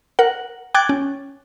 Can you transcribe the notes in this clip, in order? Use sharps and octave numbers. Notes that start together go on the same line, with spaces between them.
A#4 F#5
G5 D6 F#6 G#6 A6
C#4